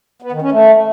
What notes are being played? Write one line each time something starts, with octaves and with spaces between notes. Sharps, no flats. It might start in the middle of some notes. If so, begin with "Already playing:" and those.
B3
D#3
C#4
A3